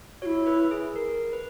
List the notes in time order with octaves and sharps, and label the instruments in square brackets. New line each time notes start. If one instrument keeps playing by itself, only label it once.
[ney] F#4 [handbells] C#5
[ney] E4
[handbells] B4
G#4
A#4
B4